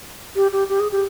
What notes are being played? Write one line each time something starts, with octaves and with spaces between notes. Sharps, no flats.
G4
G4
G4
G#4
G4